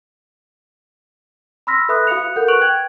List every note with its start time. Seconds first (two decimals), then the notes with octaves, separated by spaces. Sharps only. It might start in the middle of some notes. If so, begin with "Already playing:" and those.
1.67 B5 C6 E6 F6 A#6 B6
1.89 A4 B4 E5 B5 D#6 F#6
2.07 F#4 F5 D#6 F#6 C#7 F7
2.36 F#4 A4 A#4 F#5 G6
2.48 B4 C#6 F#6 D7 F7 F#7
2.61 G5 G#6